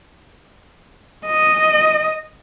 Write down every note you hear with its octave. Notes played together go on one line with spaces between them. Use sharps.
D#5